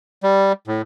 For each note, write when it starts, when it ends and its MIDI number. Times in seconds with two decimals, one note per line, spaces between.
0.23 0.52 55
0.68 0.82 45